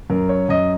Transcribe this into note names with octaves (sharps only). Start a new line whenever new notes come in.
F#2 A#4
C#5
F#2 D#5